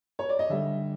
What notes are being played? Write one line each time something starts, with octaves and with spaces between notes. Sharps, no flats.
C#5
D5
D#5
D3 G3 E5